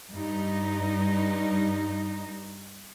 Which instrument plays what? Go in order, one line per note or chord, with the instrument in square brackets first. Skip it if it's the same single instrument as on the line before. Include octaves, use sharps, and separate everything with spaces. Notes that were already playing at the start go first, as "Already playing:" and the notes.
[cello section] G2 D#4